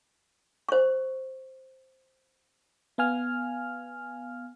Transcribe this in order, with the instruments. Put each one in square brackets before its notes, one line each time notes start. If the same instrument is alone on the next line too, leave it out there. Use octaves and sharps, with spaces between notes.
[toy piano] C5 C#6
[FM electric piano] B3 F5 G#5 F6